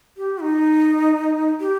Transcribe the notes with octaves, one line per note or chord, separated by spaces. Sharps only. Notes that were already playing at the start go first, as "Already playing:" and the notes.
G4
D#4
G4